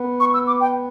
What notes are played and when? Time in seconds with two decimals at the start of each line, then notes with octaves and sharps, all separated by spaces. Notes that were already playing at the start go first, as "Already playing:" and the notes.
Already playing: B3
0.20 C#6
0.34 E6
0.47 D6
0.61 G5